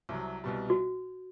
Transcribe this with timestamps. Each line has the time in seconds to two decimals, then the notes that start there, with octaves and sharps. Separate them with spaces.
0.09 C2 C3 F#3
0.44 C2 B2 G3
0.70 F#4